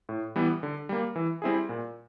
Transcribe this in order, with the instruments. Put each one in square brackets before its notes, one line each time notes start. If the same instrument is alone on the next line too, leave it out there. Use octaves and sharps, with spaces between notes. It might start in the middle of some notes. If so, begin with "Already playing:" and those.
[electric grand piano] A2
E3 G3 B3
D3
G3 A#3
E3
G3 C4 E4 G#4
A#2